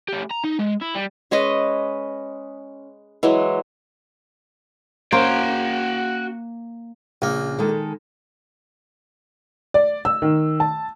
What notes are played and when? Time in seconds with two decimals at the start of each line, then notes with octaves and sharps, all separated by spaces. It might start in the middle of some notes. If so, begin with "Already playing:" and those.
0.08 A3 G4
0.31 A#5
0.44 D#4
0.59 G#3
0.82 E4
0.95 G3
1.31 G#3 C#4 B4 D#5
3.23 E3 F#3 G#3
5.12 A#3 C#4 F#4 C5 G5
7.22 A#1 C#3 A#3
7.59 D#3 G#3 A4
9.74 D5
10.05 E6
10.22 D#3
10.60 A5